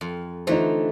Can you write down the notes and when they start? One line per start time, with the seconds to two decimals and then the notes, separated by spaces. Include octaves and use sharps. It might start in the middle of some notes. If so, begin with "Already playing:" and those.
0.01 F2
0.47 D3 E3 A3 D#4 F4 C5